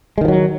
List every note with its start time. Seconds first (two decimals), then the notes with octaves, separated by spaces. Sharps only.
0.18 G#3
0.21 D#3
0.25 F3
0.28 F#3